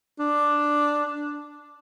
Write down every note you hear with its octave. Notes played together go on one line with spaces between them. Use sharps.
D4